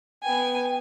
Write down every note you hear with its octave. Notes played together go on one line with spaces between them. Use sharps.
B3 G5 G#5